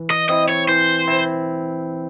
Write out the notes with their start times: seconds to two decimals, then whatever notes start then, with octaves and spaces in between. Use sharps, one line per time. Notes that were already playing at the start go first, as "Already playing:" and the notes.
Already playing: E3
0.10 D#5
0.29 C4 E4 D#5
0.49 C#5
0.68 E3 C5
1.07 C4 E4